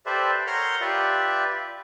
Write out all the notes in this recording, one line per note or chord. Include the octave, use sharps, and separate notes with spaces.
G4 A4 B4 C5 D5 E5
A#4 C#5 F#5 C6 F6 G6
F4 G4 B4 D5 E5